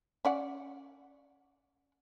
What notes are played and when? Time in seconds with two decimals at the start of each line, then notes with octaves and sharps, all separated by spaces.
0.25 C#4 D5 F#5